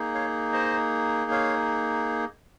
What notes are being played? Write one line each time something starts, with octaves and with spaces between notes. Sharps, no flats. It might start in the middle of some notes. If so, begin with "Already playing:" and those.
Already playing: A#3 D#4 G#4
C#5 F5
C5 D#5
C#5 F5